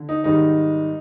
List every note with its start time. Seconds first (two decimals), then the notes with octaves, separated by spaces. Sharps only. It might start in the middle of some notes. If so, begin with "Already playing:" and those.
Already playing: D3
0.09 D#4
0.24 G#2 D#3 G3 D#4